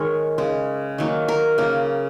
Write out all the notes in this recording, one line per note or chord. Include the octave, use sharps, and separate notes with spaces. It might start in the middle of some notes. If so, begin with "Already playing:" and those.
Already playing: D#3 G#3 A#3 G#4 A#4 C#5
C#3 G#3
D#3 F#3 A#3
A#4
C#3 A#3